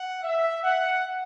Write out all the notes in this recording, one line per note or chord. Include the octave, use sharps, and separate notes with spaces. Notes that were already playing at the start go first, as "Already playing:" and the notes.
Already playing: F#5
E5
F#5